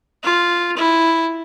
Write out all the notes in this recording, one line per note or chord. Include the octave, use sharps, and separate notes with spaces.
F4
E4